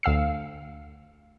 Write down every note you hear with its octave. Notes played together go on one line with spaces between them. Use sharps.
D2 F5 E6 C7